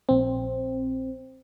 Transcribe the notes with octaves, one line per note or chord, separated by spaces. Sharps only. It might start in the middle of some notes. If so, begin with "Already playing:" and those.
A#1 C4